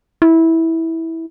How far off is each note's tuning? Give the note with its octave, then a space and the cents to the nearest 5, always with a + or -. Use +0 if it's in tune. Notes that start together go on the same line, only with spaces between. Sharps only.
E4 -15